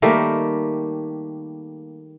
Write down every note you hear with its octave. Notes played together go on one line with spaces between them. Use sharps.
D#3 G3 A3 A#3